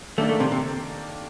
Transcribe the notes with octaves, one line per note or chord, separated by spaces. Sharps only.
D#3 A3 A#3 D4 A4
A3
C3
C3